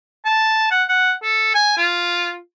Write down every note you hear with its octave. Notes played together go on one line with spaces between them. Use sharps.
A5
F#5
F#5
A4
G#5
F4